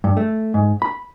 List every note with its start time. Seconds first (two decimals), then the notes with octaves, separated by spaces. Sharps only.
0.04 G2
0.17 A3
0.54 G#2
0.82 B5